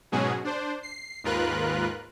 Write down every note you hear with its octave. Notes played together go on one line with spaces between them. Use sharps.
G#2 B2 F#3 C#4 F#4 G#4
D4 C5
C7
D#2 G#2 F4 A#4 B4 F#6